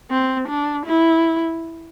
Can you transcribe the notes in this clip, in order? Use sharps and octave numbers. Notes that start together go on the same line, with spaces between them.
C4
D4
E4